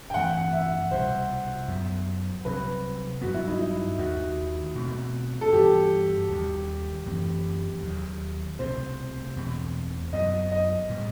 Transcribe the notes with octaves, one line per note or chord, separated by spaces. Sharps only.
G5
G2 E3 A3 C4 F#5
E5
C2 B2 G3 C5
F#2 F#3 B3
C2 C3 F#3 C4 B4
G2 F#3 B3 F#4
E4
D#4
E4
D#2 D#3 A3 F#4
B2 A3 C4
A4
G2 E3 B3 G4
D#2 D#3 G3
F#2 E3 A3 C4
D#2 D#3 F#3
C2 B2 A3 C4 C5
E2 B2 A3 C4
F#2 F#3 B3 D#5
D#5
A2 G3 B3